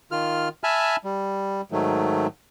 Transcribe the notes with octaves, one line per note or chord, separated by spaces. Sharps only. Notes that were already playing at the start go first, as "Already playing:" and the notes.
D#3 F4 F6
E5 G#5 A5 B5 F6
G3
G#2 D#3 F#3 A3